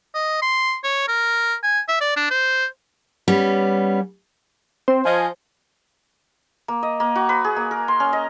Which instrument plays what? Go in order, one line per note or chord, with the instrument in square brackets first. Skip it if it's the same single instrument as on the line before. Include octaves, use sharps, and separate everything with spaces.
[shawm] D#5
C6
C#5
A#4
G#5
E5
D5
D4
C5
[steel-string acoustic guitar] G3 B3 C#4
[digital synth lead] C4 [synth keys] C5
[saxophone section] F3 D#5 [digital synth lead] G#5
[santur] A#3
D#5
A#3
F#4
B4
G#4
A#3
A#4
C6
C#4
D#5